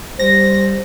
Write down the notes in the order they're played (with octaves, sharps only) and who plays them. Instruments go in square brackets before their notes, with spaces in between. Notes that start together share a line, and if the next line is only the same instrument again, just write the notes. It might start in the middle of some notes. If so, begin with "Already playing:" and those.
[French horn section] G3 C5 [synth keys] A#6